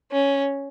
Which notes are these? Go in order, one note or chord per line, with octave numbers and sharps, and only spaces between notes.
C#4